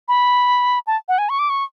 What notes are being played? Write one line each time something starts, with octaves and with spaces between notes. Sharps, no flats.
B5
A5
F#5
G#5
C#6
D6
C#6